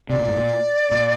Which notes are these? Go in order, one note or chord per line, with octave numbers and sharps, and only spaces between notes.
C3 D5
A#2
G#2
A#2
A#2